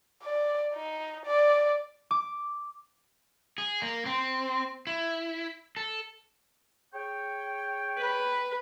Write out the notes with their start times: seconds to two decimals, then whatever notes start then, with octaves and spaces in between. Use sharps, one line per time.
0.23 D5
0.74 D#4
1.26 D5
2.11 D6
3.58 G#4
3.82 A#3
4.06 C4
4.87 E4
5.77 A4
6.94 G#4 C#5 G5
7.99 B4